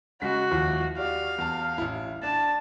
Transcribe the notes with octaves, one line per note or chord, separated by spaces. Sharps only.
C#3 G#3 F#4 B6
D#2 F3 E4
F#4 G4 D5 F5
E2 A5
A1 E4
D4 A5